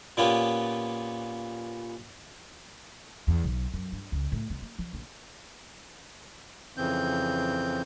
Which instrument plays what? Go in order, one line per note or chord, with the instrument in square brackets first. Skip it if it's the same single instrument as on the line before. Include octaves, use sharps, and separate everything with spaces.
[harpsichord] A#2 A#3 B3 C#4 F4 G4
[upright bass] E2
B1
F#2
G2
C#2
A2
C2
A#3
F3
A#1
[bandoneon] F2 C#3 E3 C4 G6